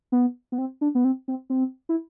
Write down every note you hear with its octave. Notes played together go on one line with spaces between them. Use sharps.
B3
B3
C4
D4
B3
C4
C4
C4
E4